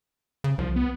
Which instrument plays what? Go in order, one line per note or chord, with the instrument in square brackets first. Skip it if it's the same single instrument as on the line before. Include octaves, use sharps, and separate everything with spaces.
[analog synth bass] C#3
[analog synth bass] C2 [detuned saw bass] F3
[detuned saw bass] B3